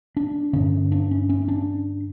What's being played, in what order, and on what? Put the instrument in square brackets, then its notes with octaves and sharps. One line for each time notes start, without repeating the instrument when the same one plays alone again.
[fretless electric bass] D4
G2 D3 C#4
D4
C#4
C#4
D4